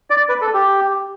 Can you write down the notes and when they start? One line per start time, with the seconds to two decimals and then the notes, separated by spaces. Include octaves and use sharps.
0.10 D5
0.29 B4
0.41 A4
0.54 G4